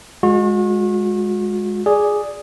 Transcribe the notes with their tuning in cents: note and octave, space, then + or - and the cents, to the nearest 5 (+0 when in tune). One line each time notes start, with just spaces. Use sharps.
G#3 +0 F#4 -40
G#4 +0 D5 +0